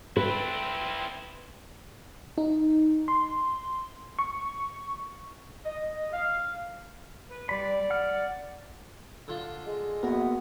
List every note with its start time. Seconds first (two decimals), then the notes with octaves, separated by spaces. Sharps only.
0.17 C4 E4 B4
2.38 D#4
3.08 C6
4.19 C#6
5.65 D#5
6.13 F5
7.29 B4
7.49 G3 D5 B5
7.90 F#5 F6
9.28 D3 F4
9.66 G#3
10.03 A#3 B3 F#4 A#4